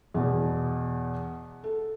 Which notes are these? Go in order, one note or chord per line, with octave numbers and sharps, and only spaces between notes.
E2 B2
A4